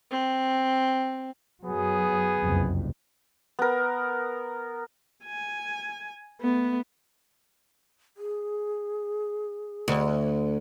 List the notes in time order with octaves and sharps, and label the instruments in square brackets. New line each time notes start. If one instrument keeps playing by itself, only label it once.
[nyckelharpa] C4
[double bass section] F#2 F#3 [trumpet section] B3 G#4
[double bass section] F#1 C2 F2
[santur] B3 A#4
[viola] G#5
A3 B3
[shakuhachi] G#4
[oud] D2